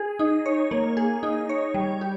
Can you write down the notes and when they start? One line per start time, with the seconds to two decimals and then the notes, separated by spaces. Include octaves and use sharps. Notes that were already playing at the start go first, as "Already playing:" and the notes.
Already playing: G#4
0.19 D#4
0.46 C#5
0.71 A#3
0.97 G#4
1.23 D#4
1.49 C#5
1.74 G3
2.01 G4